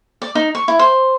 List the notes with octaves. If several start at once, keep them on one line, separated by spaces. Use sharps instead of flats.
D5
D#4
C#6
E4
C5